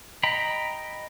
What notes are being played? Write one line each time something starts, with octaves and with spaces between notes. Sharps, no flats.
D#5 G5 A#5 B5